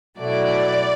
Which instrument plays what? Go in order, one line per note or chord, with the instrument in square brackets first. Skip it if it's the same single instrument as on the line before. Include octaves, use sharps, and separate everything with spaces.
[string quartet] B2 F#3 A3 E4 [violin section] D5